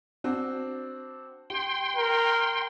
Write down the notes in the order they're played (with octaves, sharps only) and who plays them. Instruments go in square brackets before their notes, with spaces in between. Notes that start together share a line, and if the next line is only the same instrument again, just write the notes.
[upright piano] C4 D4 F#4
[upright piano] G4 [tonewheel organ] G5 C6
[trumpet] A#4